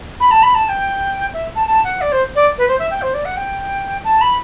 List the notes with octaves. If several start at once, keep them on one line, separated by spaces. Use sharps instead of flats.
B5
A5
B5
A5
A5
G5
E5
A5
A5
F#5
D5
C5
D5
B4
C5
E5
G5
C5
D5
F#5
G5
A5
B5